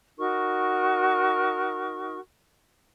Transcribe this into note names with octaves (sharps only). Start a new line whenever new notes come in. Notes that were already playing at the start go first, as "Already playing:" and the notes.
D#4 F#4 A#4 C#6